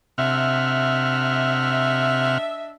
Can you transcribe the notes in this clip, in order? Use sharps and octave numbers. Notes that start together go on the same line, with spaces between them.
C3 D4 D#5 E5 F#5 F6